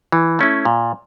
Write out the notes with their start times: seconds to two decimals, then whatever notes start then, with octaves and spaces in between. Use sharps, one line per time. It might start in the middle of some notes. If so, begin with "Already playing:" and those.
0.12 E3
0.39 A3 C#4 E4
0.65 A#2